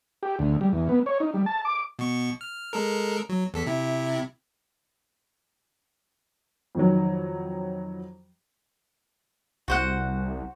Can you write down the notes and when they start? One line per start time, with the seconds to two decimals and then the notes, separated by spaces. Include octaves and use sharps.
0.23 G4
0.39 D2
0.61 G3
0.73 E2
0.89 B3
1.06 C#5
1.20 D#4
1.34 G3
1.46 A5
1.65 D6
1.99 B2 C#6
2.41 F6
2.73 G#3 A4 A#4
3.29 F#3
3.54 E2 A4 B6
3.66 C3 E4
6.75 F2 D#3 F#3
9.68 C2 F#4 C5 F#5